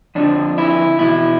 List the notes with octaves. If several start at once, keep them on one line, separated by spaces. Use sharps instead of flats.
F2 D3 F3 D4
E4
E2 B2 E4